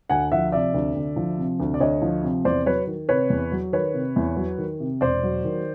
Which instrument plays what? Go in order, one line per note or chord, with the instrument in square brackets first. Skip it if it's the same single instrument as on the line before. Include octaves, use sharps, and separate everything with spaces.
[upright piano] D2 F#5 G#5
F3 E5 F#5
C3 D5 E5
D2
D2
F3
C3
D2
D5
D2 C#5 D#5
F3
C3
E2 C5 D5
F#3 B4 C#5
D#3
C3 B4 C#5
E2
F#3
D#3 B4 C#5
C3
E2
F#3
D#3
C3
E1 C5 D5
F#3
D#3